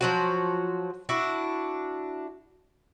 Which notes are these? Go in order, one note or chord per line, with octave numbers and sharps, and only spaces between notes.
F3 F#3 F#4
D4 E4 F#4